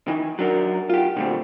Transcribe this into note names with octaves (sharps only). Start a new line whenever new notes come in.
D#3 E3
F#3 D4 A#4
F4 G4
A#2 D3 G3 A3 C4